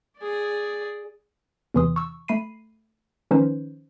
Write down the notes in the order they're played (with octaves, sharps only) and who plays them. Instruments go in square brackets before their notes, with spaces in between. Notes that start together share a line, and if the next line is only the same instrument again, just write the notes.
[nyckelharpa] G#4 D5
[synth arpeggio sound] E2 C3 E3 C6 D#6
C#6 E6
A3 B5 C7 D#7
D#3 F3 C#4 D#4 B4 C5